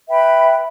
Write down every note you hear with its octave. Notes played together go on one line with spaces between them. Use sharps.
B4 E5 G5 B5